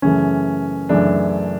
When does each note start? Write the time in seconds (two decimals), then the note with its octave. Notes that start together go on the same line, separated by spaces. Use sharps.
0.02 F#2 C#3 E3 A3 C#4
0.89 F#2 C#3 E3 A3 D4